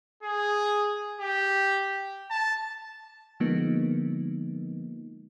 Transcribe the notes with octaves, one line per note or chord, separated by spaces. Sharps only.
G#4
G4
A5
D3 F3 G#3 A#3 B3 D#4